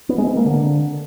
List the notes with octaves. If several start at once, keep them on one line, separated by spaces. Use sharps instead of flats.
B3
G#3
C4
A#3
D3